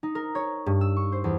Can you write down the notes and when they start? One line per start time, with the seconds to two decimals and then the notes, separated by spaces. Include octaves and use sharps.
0.03 D#4
0.15 A#4
0.35 C#5
0.66 G2
0.81 E6
0.96 C#6
1.12 C5
1.24 E2